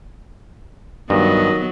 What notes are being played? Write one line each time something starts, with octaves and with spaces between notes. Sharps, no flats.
G2 D#3 F#3 B3 D#5